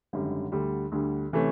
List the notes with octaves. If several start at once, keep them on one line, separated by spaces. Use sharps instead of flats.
G#1 F#2 D3 G3
D2 D3 G3
D2 D3 G3
C3 E3 A3 C#4